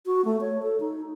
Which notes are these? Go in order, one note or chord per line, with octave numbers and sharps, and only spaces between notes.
F#4
A3
C#5
A4
D#4